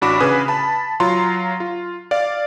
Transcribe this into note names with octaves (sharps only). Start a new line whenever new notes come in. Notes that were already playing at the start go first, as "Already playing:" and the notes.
A1 D4 F#4 B5 D6 E7
C#3 B4 G#5 D#6
A5 B5
F#3 F4 A#5 C6
F4
D5 F5